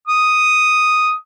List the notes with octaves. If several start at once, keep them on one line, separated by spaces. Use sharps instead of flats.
D#6